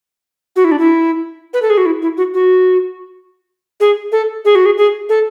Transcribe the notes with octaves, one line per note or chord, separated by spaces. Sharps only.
F#4
E4
D4
E4
B4
A4
G#4
F#4
E4
E4
F#4
F#4
G#4
A4
G#4
F#4
G#4
G#4
A4